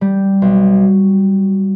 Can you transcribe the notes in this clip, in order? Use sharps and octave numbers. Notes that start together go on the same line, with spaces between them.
G3
B1